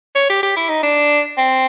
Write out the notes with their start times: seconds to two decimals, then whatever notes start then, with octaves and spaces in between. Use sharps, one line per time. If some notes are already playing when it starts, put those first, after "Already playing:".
0.16 C#5
0.30 G4
0.43 G4
0.57 E4
0.69 D#4
0.83 D4
1.38 C4